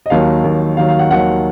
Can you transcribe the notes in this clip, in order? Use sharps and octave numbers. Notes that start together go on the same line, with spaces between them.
D#5
D#2 D#3 F#3 F5
D#2 D#3 F#3
D#2 D#3 F#3 F5
F5
F#5
D#2 D#3 F#3 F#5